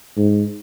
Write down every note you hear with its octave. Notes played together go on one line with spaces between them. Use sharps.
G#2